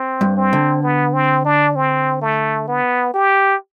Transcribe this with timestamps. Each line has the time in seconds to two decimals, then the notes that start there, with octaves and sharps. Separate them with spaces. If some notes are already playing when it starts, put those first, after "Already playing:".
Already playing: C4
0.21 G2
0.37 C4
0.53 D3
0.83 B3
1.14 C4
1.45 D4
1.76 C4
2.21 A3
2.68 B3
3.14 G4